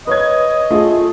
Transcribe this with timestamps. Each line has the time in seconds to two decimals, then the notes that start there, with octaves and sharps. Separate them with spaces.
0.07 B4 C#5 D#5 G#6
0.71 A3 F4 G#4